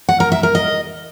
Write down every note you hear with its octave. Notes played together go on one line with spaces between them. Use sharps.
F#5
A#4
E5
A#4
D#5